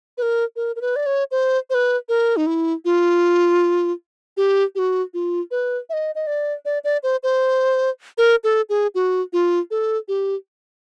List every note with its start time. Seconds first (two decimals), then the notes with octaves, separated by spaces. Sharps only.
0.18 B4
0.22 A#4
0.56 A#4
0.76 A#4
0.81 B4
0.96 D5
1.06 C#5
1.31 C5
1.70 C5
1.74 B4
2.09 A#4
2.37 D#4
2.47 E4
2.85 F4
4.37 G4
4.75 G4
4.79 F#4
5.14 F4
5.51 B4
5.90 E5
5.93 D#5
6.15 D#5
6.27 D5
6.65 D5
6.84 D5
7.03 C5
7.23 C5
8.18 A#4
8.44 A4
8.69 G#4
8.95 F#4
9.33 F4
9.71 A4
10.08 G4